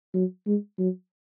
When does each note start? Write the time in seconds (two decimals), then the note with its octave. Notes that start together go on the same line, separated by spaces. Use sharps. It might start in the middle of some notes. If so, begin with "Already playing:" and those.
0.14 F#3
0.47 G#3
0.79 F#3